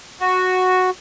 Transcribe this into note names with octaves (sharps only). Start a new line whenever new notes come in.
F#4